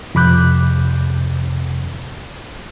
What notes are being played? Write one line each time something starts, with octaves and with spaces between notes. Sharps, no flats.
F2 C3 B5 D6 F#6 G6